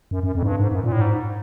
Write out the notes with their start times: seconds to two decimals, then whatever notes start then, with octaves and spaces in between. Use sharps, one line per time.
0.11 F#2
0.23 F#2
0.35 F2
0.43 G#2
0.47 G2
0.59 G#2
0.72 F#2
0.84 A#2
0.92 A2
1.01 G#2